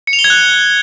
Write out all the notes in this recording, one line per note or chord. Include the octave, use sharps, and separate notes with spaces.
C#7
F7
G7
G#6
F#6